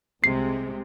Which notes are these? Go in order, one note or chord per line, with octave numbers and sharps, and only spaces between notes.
C2 C3 G#3 C7